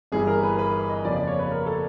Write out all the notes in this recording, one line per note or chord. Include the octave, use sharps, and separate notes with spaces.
G1 G2 E3 G#4
A#4
B4
B4
D#5
F2 C#3 F3 A#3 D5
D5
C#5
B4
A#4
A4